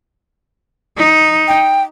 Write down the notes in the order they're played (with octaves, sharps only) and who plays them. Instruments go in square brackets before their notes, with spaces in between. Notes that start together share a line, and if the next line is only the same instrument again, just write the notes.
[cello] D#4
[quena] G5